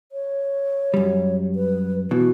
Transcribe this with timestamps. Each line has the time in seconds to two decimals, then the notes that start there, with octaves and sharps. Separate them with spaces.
0.12 C#5
0.94 F#2 G3
1.56 B4
2.11 B2 E3 F#4